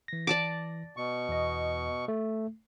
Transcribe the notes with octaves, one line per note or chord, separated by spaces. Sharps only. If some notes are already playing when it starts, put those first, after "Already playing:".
E3 A#6
D5 A5 D6
B2 C#6
E2 D#5
A3